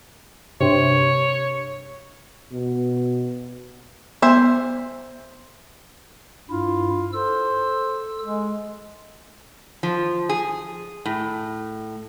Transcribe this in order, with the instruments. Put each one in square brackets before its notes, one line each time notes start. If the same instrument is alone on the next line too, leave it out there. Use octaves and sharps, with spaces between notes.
[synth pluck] G2 C3 [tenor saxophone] C#5
[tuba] B2
[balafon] B3 [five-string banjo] C5 E5
[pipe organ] G2 E4 [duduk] F4
[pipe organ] A4 E6 [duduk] C5
[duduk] G#3
[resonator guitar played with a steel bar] F3
G#4
A2